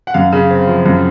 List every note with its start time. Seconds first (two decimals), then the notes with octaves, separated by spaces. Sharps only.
0.07 F#5
0.14 F#2 F5
0.32 C#3
0.50 C4
0.68 F3
0.86 F#2